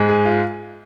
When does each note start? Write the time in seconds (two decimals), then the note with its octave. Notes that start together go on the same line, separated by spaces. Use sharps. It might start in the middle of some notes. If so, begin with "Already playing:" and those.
Already playing: G#2 G#3
0.09 G#4
0.25 F4